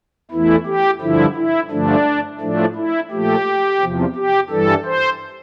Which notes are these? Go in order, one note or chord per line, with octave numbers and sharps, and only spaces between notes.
E2 E3 A3 E4
G4
G2 D3 F3 E4
E4
G2 D3 F3 A3 D4
A2 F3 A3 D4
E4
A#2 F3 A3 G4
E2 C3 F3
G4
G2 E3 G3 A4
C5